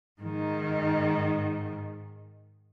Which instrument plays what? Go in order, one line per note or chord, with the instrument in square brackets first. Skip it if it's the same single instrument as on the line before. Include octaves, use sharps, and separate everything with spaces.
[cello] G#2 D#3